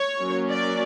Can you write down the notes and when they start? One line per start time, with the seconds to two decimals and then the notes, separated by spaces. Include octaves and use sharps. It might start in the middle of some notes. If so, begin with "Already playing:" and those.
Already playing: C#5
0.20 F#3 A#3 C#4
0.51 D5